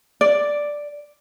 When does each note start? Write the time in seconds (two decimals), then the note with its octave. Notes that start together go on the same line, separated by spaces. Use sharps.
0.21 D5